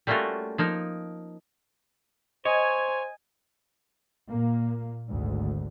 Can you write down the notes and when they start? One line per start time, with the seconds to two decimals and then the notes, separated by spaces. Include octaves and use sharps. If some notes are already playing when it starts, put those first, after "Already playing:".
0.07 G3 A3 A#3 C#4 F4 F#4
0.58 F3 A#3 D#4
2.45 C5 C#5 D#5 G#5
4.30 A#2 A#3
5.10 G#1 D2